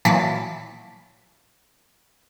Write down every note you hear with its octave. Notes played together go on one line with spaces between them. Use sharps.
A#2 E3 F#3 A5 D6 B6